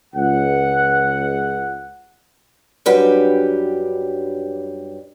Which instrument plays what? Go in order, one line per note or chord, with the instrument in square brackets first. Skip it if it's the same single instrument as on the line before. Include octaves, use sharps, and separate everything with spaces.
[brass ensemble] C#2 F#5
[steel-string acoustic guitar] F#2 G3 D4 F#4 G4 B4